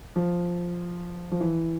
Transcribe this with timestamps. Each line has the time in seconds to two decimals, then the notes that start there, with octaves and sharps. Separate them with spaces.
0.16 F3
1.32 F3
1.40 E3